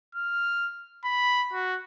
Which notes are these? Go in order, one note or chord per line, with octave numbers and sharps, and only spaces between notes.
F6
B5
F#4